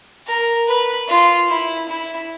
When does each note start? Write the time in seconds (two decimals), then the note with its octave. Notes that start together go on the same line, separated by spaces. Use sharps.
0.27 A#4
0.68 B4
1.08 F4
1.49 E4
1.89 E4